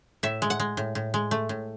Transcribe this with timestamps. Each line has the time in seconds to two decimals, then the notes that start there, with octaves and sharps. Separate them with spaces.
0.23 A2 E5
0.42 G#3
0.50 F#5
0.60 G#3
0.77 A2
0.95 A2
1.14 G#3
1.31 A3
1.49 A2